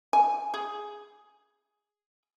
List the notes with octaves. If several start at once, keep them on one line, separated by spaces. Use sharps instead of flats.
G#5
G#4